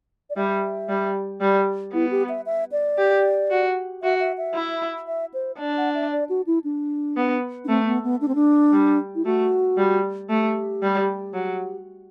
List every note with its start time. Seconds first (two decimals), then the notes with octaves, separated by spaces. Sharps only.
0.30 D5
0.37 G3 E5
0.89 G3
1.41 G3 D5
1.93 B3 E4
2.11 G4
2.29 E5
2.46 E5
2.72 D5
2.98 G4
3.50 F#4
4.03 F#4 E5
4.20 E5
4.38 E5
4.54 E4
5.07 E5
5.34 C5
5.59 D4 D5
5.77 F#5
5.95 E5
6.12 D5
6.29 F#4
6.47 E4
6.64 D4
7.16 B3
7.65 D4
7.68 A3 C4
7.86 B3
8.04 B3
8.21 D4
8.28 C4
8.35 D4
8.73 G3
9.15 E4
9.25 A3 F#4
9.77 G3
10.30 A3 G4
10.83 G3
11.34 F#3